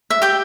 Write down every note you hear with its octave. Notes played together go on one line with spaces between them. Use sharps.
E5
G4 G5